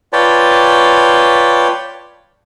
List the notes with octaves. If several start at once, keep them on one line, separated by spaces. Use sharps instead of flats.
F4 B4 C#5 D5 G5 A5